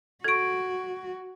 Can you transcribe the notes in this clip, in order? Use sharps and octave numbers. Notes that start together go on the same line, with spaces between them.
F#4 A4 C#6 G#6 D7